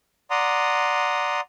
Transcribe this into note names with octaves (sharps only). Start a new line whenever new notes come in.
D5 F#5 A#5 C6 D#6